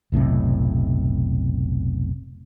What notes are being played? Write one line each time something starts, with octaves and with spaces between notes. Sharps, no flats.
F1 B1 A2 C3